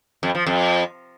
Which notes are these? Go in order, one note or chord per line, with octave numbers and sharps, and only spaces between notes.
F2
F3
F2